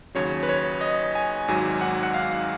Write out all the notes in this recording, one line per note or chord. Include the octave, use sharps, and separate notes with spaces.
D#2 C#3 F#3 C#5
B4
C#5
D#5
G#5
G#1 G#2 F#3 G#5
F#5
F#5
F5